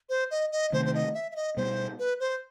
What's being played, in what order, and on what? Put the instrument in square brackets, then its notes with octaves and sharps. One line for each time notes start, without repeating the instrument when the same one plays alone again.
[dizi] C5
D#5
D#5
[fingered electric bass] C3 D#3 A3 [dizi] C5
[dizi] C5
D#5
E5
E5
D#5
[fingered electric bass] B2 G3 B3 [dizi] C5
[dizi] B4
C5